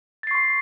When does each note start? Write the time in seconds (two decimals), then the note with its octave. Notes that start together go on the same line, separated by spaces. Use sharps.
0.23 A6
0.27 C7
0.31 C#6
0.35 C6